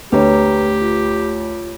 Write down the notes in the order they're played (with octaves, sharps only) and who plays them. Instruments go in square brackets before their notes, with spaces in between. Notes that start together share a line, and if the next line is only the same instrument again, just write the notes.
[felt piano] D2 C#5 [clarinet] G4 [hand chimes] B4 G5 A#5
[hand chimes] F4